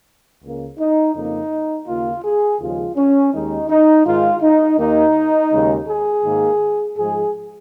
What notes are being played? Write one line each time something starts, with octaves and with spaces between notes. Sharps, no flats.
C#2 C#3 A#3
D#4
F2 C#3 A#3 D#4
D#2 C#3 A#3 F4
G#4
D#2 C#3 F3 G#3 F4
C#4
D#2 D#3 G#3 D#4
D#4
G#2 D#3 G#3 F4
D#4
D#2 D#3 A#3 D#4
D#2 C#3 G#3
G#4
G#2 D#3 A#3
G#2 F3 G#3 G#4